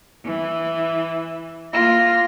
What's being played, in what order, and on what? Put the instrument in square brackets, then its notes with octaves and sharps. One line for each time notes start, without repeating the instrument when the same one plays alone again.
[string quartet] E3
[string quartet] A#3 [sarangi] F4 [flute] A#6